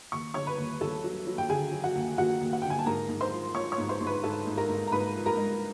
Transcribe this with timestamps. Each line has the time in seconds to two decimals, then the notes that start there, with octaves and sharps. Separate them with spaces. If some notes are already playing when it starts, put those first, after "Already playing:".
0.12 D#2 C#6
0.34 D3 C#5 C#6
0.47 B4 B5
0.58 D#2
0.81 D#2 A4 A5
1.04 F#3
1.27 F#3
1.38 G5
1.49 D3 G#4 G#5
1.72 F#3
1.83 F#4 F#5
1.96 D#2
2.18 D#2 F#4 F#5
2.41 D#2
2.53 F#5
2.62 D3 G5
2.70 G#5
2.78 A5
2.86 G#2 A#4 A#5
3.09 G#2
3.21 C5 C6
3.32 F3
3.55 F3 C#5 C#6
3.72 C#5 C#6
3.78 G#2
3.89 C5 C6
4.01 G#2
4.06 B4 B5
4.23 G#2 A4 A5
4.47 G#2
4.57 A#4 A#5
4.69 G#2
4.87 A#5
4.92 G#2 B4 B5
5.14 F3
5.26 A#4 A#5
5.37 G#3